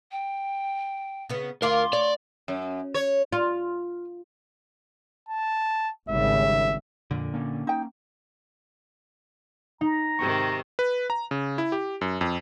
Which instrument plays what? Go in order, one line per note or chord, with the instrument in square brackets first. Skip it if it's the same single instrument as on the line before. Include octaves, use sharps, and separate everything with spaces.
[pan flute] G5
[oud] C#3 B3
[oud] D2 F4 D5 [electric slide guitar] A#4 [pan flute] C6
[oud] C#5 [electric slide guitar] D5
[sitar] F#2
C#5
[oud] F4
[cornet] A5
[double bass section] G#1 C#3 G3 [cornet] E5
[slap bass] F2 [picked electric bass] A#2 D3
[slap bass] A#3 C#4
[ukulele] D#4 G5
[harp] D#4 [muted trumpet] A#5
[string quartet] G#2 C3 D#3 [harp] G4 C#6
[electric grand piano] B4
A#5
C#3
E4
G4
F#2
F2